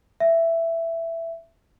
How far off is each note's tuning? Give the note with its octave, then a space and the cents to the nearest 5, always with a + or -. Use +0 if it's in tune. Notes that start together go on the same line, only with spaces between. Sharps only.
E5 +10